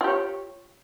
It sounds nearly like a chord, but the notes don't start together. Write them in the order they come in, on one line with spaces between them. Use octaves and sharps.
F4 G4 C#5